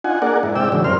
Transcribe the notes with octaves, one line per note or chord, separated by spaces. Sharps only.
D4 D#4 F4 F#5 G#5
A#3 D4 G#4 A#4 D5 F#5
G#2 E4
C3 G#3 D5 G5 E6
D#2 G#2 C#3 E3 F#3 D4
F#2 C3 G3 A#4 C6 F6